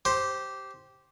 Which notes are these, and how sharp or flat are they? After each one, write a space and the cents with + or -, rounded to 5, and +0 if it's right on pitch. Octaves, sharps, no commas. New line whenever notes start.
G4 -10 C5 +5